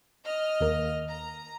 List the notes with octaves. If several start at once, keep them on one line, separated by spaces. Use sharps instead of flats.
D#5 F6
D#2 A#3
A#5